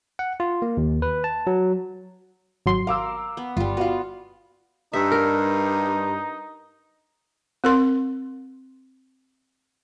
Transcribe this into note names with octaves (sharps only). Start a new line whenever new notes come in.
F#5
F4
A#3
D#2
B4
A5
F#3
G#1 F#3 C6
A#4 F5 D6 E6
B3
G1 G3 F4
B3 F4 F#4 F5
G2 D#4 E5
A#4
C4 A#4 C6